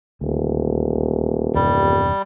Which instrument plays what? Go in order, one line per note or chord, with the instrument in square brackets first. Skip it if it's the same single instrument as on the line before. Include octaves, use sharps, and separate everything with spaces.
[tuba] D#1 [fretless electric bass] D2
[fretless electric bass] E2 G2 C3 [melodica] G3